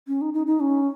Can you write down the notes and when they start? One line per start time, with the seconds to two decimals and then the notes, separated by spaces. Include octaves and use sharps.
0.08 C#4
0.21 D#4
0.34 D#4
0.47 D#4
0.60 C#4